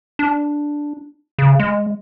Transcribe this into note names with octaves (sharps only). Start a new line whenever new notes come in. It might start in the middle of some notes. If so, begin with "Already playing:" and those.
D4
C#3
G#3